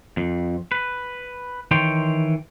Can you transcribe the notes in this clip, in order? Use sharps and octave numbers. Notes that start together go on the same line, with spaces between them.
F2
B4
D#3 E3 C#5 G5 C6